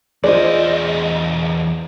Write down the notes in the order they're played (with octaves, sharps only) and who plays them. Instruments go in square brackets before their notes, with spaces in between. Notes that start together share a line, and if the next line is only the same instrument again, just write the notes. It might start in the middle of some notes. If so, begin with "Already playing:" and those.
[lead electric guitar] E2 D#5 [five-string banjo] F4 D5 [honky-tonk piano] G#4 C5